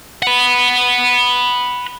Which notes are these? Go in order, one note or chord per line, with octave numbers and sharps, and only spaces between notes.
F#5 B5